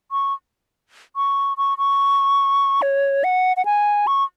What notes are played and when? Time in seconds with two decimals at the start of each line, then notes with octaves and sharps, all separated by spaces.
0.12 C#6
1.16 C#6
1.57 C#6
1.78 C#6
2.82 C#5
3.24 F#5
3.57 F#5
3.65 G#5
4.07 C#6